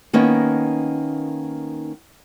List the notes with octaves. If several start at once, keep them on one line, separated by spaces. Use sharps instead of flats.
D#3 A#3 B3 C#4 D#4